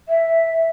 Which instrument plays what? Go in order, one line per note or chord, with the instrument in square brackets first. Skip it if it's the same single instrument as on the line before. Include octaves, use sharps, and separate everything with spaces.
[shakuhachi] E5